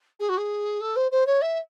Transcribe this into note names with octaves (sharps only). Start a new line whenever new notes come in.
G#4
F#4
G#4
A4
C5
C5
C#5
E5